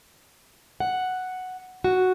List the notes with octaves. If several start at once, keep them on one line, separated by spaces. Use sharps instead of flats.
F#5
F#4